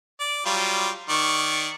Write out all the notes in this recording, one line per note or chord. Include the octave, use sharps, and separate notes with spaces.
D5
F#3 G3 F4
D#3 D5 C#6